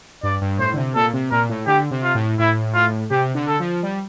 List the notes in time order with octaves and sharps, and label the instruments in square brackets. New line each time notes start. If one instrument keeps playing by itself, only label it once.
[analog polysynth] G2 [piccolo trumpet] D5
[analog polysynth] G2
[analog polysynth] A2 [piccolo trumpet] C5
[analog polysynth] D3
C3
[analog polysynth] A#2 [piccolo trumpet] A4
[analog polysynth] C3
[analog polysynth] A#2 [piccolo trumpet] A#4
[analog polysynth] A2
[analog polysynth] D3 [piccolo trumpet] G4
[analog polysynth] C3
[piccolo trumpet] F4
[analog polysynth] A2
[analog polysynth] A2 [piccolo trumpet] E4
[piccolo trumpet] F4
[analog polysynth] C3 [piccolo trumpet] G4
[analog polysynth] D3
[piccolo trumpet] A4
[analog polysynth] F3
G3